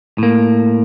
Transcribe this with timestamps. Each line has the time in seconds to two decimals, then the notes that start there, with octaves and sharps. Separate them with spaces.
0.18 A2 A#3